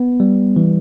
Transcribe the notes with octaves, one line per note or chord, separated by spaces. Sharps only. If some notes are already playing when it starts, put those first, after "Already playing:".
Already playing: B3
G3
E3